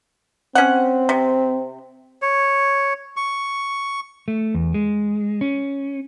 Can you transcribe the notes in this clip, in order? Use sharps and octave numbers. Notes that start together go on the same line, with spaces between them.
C4 C#4 F#5
C3
C#5
C#6
A3
E2
G#3
C#4